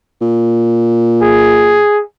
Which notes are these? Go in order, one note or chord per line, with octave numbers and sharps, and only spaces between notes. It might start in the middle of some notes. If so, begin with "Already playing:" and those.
A#2
G#4